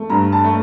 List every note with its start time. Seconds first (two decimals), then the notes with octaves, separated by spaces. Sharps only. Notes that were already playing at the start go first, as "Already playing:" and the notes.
Already playing: A3
0.09 G2 A#5
0.32 A5
0.44 A3